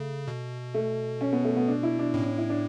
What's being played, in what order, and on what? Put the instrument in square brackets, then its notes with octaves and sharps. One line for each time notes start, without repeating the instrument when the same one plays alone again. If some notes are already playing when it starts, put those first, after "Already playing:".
Already playing: [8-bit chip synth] C#3 [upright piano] A3
[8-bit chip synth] B2
[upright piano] A3
C#4
B3
A3
B3
D4
E4
D4
[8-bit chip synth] A2 [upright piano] C#4
[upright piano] D4
E4
D4